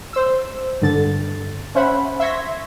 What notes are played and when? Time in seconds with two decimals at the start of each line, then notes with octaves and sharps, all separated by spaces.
0.13 C5 E6
0.82 G2 D3 A6
1.75 C#4 C5 E5 F#5 B5
2.20 E5 C6 C#6 G#6 A#6 B6